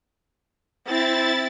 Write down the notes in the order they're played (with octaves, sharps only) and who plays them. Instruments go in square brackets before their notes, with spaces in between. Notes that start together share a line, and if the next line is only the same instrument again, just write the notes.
[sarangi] C4 [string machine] E4 A6